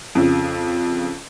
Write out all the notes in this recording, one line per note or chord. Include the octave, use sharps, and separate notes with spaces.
F2 C#3